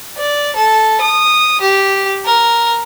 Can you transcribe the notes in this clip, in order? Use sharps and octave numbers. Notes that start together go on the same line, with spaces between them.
D5
A4
D#6
G4
A#4